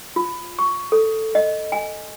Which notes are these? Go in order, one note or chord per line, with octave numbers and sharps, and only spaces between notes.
F4
C#6
A4
D#5
G#5